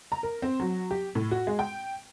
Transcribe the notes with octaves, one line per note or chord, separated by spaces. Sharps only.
A#5
A#4
C4
F#3
G4
A2
F#4
G#3
G5